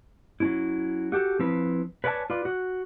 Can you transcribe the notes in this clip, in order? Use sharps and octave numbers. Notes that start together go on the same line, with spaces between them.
F#3 C#4 E4
F#4 G4 A4
F3 C4 E4 B4
B4 C#5 D5 F#5 G#5 A5
F4 B4 D5
F#4